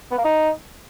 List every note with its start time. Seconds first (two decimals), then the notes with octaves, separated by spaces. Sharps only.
0.12 B3
0.18 A#3
0.24 D#4